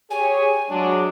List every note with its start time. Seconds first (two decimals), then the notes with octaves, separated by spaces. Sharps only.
0.10 G4 G#4 C#5 G#5
0.70 F#3 G#3 D4